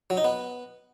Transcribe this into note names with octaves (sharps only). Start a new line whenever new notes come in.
F#3
D#4
B3